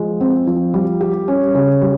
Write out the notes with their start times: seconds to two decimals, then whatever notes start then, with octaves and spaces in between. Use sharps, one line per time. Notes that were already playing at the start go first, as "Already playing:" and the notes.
Already playing: F3 G#3
0.21 C4
0.47 F3
0.74 G3
1.01 G4
1.28 C#4
1.55 C#3
1.81 G3